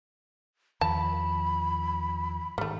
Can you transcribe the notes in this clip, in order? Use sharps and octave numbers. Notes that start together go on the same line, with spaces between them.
E2 D#3 F3 A5 B5
G#2 D#3 G3 A3